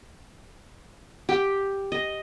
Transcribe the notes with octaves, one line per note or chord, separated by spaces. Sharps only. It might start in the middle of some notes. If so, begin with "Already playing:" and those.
G4 G5
D#5